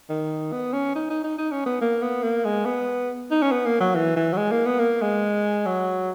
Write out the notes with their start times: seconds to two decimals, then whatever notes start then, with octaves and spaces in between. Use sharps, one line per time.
0.09 D#3
0.52 B3
0.73 C#4
0.95 D#4
1.10 D#4
1.24 D#4
1.38 D#4
1.51 C#4
1.66 B3
1.81 A#3
2.02 B3
2.23 A#3
2.45 G#3
2.66 B3
3.31 D#4
3.42 C#4
3.51 B3
3.66 A#3
3.80 F#3
3.95 E3
4.16 E3
4.33 F#3
4.37 G#3
4.51 A#3
4.66 B3
4.79 A#3
5.02 G#3
5.66 F#3